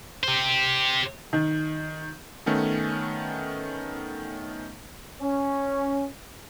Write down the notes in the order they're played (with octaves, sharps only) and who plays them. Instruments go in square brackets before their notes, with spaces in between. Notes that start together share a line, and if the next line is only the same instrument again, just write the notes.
[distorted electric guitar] G4 C5
[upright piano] D#3
[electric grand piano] D#3 A3 B3 C#4 A4
[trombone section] C#4